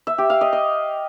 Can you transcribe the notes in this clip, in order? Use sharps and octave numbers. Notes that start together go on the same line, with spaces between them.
E5
G4
F5
D#5
D#5